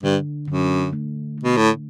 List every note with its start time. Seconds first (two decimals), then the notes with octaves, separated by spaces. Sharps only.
0.03 G2 D3
0.48 F#2 D3
0.93 A3
1.38 A3
1.43 B2
1.57 A2